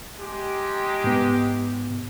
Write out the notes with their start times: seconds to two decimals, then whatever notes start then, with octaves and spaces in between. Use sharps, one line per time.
0.19 G#3 D#4 G4
1.04 G#2 B3